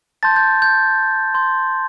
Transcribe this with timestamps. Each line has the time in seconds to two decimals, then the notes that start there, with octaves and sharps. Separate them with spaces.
0.23 A5 C6 G6 A6
0.36 G6
0.62 G6
1.34 C6 G6